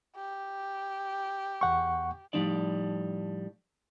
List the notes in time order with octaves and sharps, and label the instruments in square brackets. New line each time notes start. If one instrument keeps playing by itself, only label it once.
[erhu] G4
[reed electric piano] E2 F#5 C#6
[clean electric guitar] A2 F3 G3 D4 D#4 D5